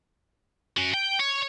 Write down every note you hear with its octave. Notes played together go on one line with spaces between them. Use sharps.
C#4 F#4
G5
C#5